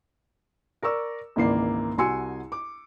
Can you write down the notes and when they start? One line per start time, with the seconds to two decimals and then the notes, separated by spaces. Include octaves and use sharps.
0.82 A#4 D5 C#6 E6
1.36 G#1 C#2 E3 A#3 D5 C7
1.98 C2 F#4 G#5 C6 E6 C#7
2.52 D6